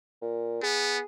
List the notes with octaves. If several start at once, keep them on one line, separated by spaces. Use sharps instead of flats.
A#2
B3 G#4